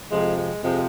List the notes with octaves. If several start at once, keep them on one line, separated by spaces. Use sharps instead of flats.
F2 C3 F3 G#3
G#3
F2 C3 F3 G#3